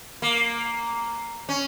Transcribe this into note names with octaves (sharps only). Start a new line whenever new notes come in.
A#3
C#4